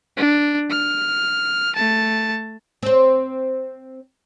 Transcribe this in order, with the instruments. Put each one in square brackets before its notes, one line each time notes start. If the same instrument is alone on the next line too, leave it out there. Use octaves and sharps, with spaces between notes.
[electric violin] D4
F6
A3 A5
[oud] C4 C5